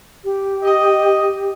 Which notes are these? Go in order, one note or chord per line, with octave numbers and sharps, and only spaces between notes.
G4
D#5